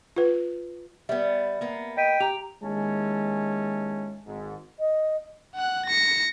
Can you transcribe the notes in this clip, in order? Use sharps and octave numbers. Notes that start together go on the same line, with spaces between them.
F4 B4
G3 B3 E5
A#3 B3
D#5 G5 B6 D#7
G4 A#5 F7
D#2 G#3 C#4 E4 A5
G#1 G#2
D#5
F#5 F#6
A#6 C#7